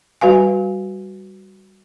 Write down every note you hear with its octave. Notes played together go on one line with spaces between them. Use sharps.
G3 F#4 B4 F5 G#5